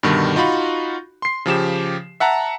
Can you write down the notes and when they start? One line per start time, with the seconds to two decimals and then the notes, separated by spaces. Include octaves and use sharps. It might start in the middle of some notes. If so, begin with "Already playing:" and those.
0.03 G2 B2 D3 D#3 G3
0.36 D#4 F4 F#4 B5 C#6
1.22 C6 C7
1.46 C#3 F3 G4 E7
2.20 E5 F#5 A5 A#5